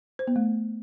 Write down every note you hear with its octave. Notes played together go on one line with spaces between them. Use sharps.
C5
B3
A3